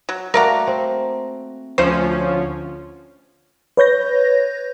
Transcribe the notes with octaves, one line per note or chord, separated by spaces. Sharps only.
F#3
A3 A#3 F#4 A#4 D5 A#5
C4
D2 F3 C#4 C5
B4 C#5 G6 A#6